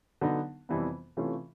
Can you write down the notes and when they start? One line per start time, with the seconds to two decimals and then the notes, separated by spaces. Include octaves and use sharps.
0.21 D3 F#3 B3 D#4
0.69 F2 C3 E3 G3 B3
1.17 C3 E3 A3 C#4 F4